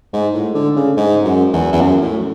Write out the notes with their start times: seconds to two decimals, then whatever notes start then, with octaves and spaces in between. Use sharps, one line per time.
0.13 G#2
0.34 A2
0.55 D3
0.76 C#3
0.97 G#2
1.25 F#2
1.54 E2
1.73 E2
1.81 F#2
2.02 A2